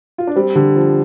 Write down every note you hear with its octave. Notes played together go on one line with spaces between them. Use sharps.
F4
D4
G3 C4
D3 G3
F3